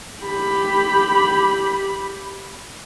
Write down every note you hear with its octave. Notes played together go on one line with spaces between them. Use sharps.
G4 B5